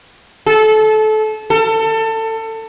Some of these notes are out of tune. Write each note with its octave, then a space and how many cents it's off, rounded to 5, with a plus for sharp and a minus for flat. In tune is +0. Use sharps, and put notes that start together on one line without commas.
A4 -25
A4 +25